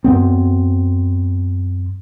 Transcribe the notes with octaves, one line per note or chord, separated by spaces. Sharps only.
F#2 B3 C4